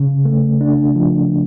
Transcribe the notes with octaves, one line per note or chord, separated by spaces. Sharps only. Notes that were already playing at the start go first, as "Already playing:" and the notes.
Already playing: C#3
A3
D4
F3